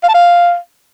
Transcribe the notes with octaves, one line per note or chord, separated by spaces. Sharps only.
F5
A5
F5